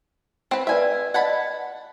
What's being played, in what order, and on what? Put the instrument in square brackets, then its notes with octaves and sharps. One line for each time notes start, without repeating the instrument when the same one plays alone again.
[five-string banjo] C4 B4
[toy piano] B4 D5 F5 [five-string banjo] E5 G#5
[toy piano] D5 D#5 [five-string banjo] F#5 A5 B5